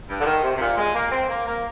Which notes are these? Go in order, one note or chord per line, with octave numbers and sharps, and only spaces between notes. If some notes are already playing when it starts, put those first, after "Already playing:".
G2
D3
D#3
C3
C3
A#2
G#3
A#3
C4
A#3
A#3